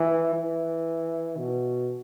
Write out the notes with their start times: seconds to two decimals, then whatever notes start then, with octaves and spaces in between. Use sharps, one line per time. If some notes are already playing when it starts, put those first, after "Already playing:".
Already playing: E3
0.35 E3
1.37 B2